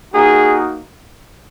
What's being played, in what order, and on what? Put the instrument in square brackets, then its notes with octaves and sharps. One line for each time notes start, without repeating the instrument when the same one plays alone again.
[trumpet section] A#3 D#4 F#4 G#4